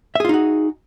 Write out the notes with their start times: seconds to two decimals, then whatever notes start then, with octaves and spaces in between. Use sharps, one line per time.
0.15 E5
0.20 G#4
0.25 F4
0.29 D#4
0.34 F#4